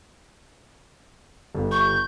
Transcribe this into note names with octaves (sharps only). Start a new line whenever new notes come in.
G1
C#6 G6